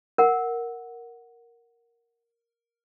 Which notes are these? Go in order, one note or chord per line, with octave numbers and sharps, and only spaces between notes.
A#4 F#5